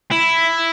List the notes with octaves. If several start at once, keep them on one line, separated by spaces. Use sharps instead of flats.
E4